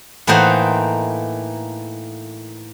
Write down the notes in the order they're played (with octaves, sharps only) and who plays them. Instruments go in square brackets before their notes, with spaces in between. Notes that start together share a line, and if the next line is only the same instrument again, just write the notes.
[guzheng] A2 E3 A#3 D#4 C5 F#5